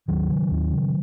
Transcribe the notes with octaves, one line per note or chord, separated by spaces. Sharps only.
D#2 D#3 F#3
C#3
D#2
C#3